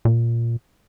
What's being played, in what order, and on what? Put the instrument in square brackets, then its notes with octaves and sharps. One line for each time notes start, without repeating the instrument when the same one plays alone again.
[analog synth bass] A#2